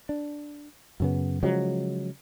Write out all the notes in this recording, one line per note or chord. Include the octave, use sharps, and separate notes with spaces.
D4
F#2 C#3 B3
C#3 F3 F#3 G#3